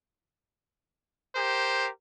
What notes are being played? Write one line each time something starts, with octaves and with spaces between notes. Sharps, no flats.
G4 A#4 C5